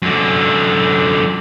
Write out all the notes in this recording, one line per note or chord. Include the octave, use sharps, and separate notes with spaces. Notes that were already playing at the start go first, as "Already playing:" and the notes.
F#2 D3